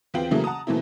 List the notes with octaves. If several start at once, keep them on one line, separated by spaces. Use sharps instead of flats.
E2 B3 C4 F4 G5 F#7
C#3 E3 F#3 A3 A#3
F#5 A5 A#5 D#6
B2 E3 A3 A#3 C4 E4